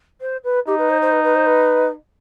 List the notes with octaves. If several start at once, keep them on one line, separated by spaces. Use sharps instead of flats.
C5
B4
D#4 G4
B4
C5
C5
B4
B4
C5
B4